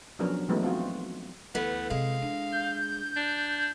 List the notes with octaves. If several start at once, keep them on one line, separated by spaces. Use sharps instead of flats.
F3 F#3 B3 C#4 D4 A#4
E3 F#3 G#3 A3 B3 D#4
C4 F4 F#4
D2 E3 A3 B3
C3 G#3 C4 F5
D4
G6
D4